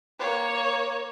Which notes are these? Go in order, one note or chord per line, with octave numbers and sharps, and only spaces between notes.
A#3 C#5